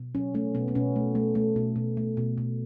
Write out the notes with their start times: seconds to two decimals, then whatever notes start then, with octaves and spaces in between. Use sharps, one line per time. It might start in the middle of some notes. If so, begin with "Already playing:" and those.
Already playing: B2
0.15 F#3 C#4
0.34 A3 C#4
0.55 B2 B3
0.68 B3
0.75 B2 C#4
0.96 A3
1.15 A3
1.35 A3
1.56 B2
1.76 B2
1.97 A3
2.17 B2
2.38 B2